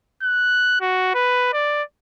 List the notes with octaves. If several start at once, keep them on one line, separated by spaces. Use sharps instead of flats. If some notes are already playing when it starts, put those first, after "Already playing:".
F#6
F#4
B4
D5